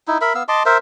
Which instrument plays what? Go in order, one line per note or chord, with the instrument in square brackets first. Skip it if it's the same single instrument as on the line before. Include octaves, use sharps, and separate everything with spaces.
[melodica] D#4 E4
A#4 E5 B5
B3 F5 E6
D#5 A5 C6 D6
A#4 C5 E5